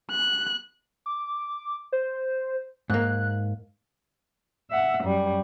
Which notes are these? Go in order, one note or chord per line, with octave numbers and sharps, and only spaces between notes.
F#6
D6
C5
G#2 A#3 F#6
E5 F#5
F#2 G3